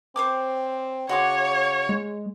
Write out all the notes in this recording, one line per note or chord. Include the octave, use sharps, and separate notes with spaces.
C4 C5 C#5 D6
C#3 F#4 C#5 C6 D6
G#3